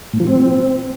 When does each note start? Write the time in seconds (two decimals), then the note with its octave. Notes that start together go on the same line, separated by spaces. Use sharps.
0.13 A2
0.20 F3
0.27 C4